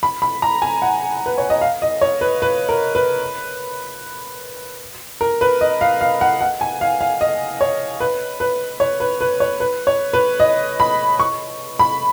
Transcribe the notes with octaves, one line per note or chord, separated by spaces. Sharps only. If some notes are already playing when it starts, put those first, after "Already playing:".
B5
B5
A#5
G#5
F#5
B4
C#5
D#5
F5
D#5
C#5
B4
B4
A#4
B4
A#4
B4
D#5
F5
F5
F#5
F#5
G#5
F5
F5
D#5
C#5
B4
B4
C#5
B4
B4
C#5
B4
C#5
B4
D#5
B5
C#6
B5